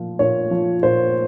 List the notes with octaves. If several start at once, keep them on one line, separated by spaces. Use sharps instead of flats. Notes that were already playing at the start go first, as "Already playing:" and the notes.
Already playing: A#2 F3
A#2 C#5
F3
A#2 C5